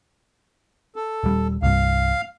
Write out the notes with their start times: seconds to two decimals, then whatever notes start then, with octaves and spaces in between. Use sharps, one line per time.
0.96 A4
1.24 D#1 G3
1.62 C2 G2 F5